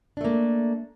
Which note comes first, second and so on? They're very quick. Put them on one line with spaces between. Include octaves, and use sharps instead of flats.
D4 A3 A#3